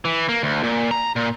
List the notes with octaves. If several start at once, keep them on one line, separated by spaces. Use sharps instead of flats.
E3
A#3
D2
A#2
A#5
A#2